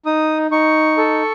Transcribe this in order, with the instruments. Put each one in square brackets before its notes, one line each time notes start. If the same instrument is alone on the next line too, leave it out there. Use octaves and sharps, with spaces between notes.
[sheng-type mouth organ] D#4 D#6
D#4 C#6
A4